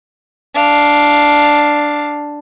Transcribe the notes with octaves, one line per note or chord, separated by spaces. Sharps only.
D4 F5